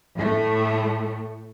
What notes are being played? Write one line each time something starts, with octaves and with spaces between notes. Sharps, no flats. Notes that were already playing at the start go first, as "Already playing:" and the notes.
A2 A3